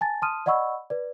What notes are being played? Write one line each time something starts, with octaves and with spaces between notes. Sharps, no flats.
G#5 A5 A6
A5 C6 D#6 F6 D#7
D5 D#5 F#5 B5 C#6 E6
B4 D5